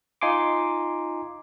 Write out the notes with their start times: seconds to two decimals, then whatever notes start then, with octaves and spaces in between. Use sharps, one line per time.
0.21 D#4 F4 G#5 C6 D6